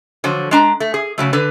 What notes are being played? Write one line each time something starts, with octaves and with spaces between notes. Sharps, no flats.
D3 F3 F#3
G#3 D4 A#5
A3
G#4
C#3 F#3 A3
D3 B4